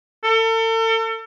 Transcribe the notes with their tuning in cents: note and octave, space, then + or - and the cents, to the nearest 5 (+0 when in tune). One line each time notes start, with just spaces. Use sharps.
A4 +40